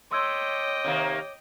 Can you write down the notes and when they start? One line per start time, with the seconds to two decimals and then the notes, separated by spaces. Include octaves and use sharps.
0.11 A3 C#5 D#5 G5 C6 D6 E6 G#6
0.84 C3 D#3 A#3